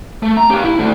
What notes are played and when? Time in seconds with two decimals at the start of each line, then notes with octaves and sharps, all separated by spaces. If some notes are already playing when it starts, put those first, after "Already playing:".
0.23 A3
0.37 A#5
0.51 G4 F5
0.64 E4
0.79 A3 F#4